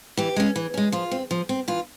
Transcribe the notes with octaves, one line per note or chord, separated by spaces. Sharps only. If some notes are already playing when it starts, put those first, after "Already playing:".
E3 G4
G#3 C#4
E3
G#3 C#4
F3 F4
C4
F3
C4
E3 F4